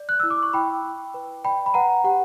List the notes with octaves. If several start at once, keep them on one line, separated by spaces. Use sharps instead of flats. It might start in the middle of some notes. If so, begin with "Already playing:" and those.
Already playing: D5
F#6
E4 E6
D6
C#6
E4 G5 B5
E4
B4
D5 G5 B5
B5
B4 F#5 A#5
G4 F#5